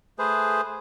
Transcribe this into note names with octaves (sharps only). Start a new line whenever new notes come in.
A3 G#4 B4 C5